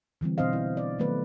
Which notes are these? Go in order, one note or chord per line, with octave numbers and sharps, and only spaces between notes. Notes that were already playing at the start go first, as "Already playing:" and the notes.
D3 E3 G3 C4
B2 C4 D4 C5 D#5 F5
E4
D5
D#3 F#3 A3 B3 B4